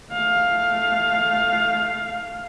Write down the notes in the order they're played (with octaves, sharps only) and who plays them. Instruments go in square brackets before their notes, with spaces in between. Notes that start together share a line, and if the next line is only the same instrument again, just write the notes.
[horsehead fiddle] A3 F5